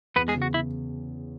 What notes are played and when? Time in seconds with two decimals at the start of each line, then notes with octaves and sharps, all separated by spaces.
0.16 E2 B3 B4
0.28 G#3 G#4
0.34 C#3
0.42 F#4
0.54 E4